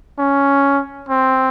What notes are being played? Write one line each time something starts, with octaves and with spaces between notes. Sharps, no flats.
C#4
C4